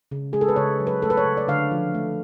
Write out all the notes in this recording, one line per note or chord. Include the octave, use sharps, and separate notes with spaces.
C#3
G#3 G#4
A4
B4
C#3 C#5
F#3
B4
A3 A4
B4
C#5
C#3
D5
D3 F5
F3
A3